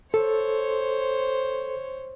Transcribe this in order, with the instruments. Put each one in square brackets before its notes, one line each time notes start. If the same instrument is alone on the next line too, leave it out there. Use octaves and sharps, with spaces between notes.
[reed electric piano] A4 [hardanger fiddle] C5 C#5